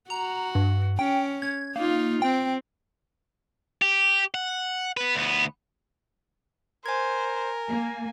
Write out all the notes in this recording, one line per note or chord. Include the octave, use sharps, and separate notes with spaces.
F#4 A#5
G2
C#4 G5
G#6
A#3 D#4 F4
C4 G5
G4
F#5
B3 B4
D2 B3
A#4 C5 G#5 G#6
A#3 G#5